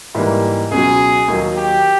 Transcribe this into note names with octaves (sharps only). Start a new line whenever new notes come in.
G#2 E3 G3 A#3
C#2 B2 F#3 G#4
D#2 D#3 F#3
G4